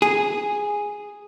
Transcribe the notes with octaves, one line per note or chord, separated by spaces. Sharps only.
G#4